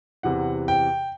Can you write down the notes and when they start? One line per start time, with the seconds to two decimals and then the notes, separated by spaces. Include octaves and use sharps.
0.23 E2 C3 E3 F#5
0.68 G5